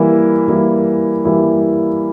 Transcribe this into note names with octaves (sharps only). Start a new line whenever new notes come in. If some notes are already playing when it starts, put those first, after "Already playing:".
Already playing: E3 G3 A#3 E4
E3 G3 A#3 E4
E3 G3 A#3 E4